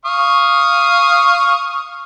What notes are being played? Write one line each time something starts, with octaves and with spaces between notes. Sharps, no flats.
F5 C#6 D#6